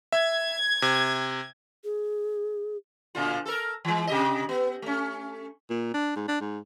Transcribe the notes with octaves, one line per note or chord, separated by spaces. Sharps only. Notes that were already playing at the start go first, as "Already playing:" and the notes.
E5 G#6
C3
G#4
A#2 D3 F4
A4 A#4
E3 G#3
C3 G4 D#5
B3
A3 C#4
A#2
D4
G#2
D4
G#2